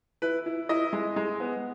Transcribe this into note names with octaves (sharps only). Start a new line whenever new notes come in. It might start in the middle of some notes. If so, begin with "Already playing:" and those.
E4 B4
E4
E4 D#5
G#3
G#3
B3